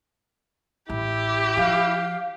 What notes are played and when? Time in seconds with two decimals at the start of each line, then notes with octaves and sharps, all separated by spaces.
0.90 A1 E4 G4
1.57 F3 F5